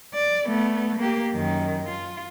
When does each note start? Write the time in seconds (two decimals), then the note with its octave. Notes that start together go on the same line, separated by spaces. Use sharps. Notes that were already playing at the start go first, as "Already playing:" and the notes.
0.14 D5
0.45 A3 B3
0.98 A#3 G4
1.33 F#2 D#3
1.88 F4